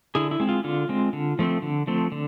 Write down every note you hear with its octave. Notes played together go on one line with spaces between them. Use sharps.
D3 E4 G#4
E4
G#3 C4
F4
D3 F4
G#3 C4
D3
F3 A3 C4
D3
F3 A3 C4
D3